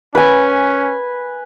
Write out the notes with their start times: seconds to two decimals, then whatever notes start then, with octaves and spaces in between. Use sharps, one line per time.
0.15 C#4 B4 G#5